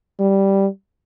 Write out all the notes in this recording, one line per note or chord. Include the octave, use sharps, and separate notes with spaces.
G3